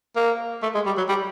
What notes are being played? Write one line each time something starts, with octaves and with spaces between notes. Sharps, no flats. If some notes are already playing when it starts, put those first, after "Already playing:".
A#3
A3
G#3
G3
F#3
G3